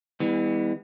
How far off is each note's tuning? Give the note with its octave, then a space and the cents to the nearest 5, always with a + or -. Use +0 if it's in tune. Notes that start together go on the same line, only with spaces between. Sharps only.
E3 -25 G3 +45 B3 +15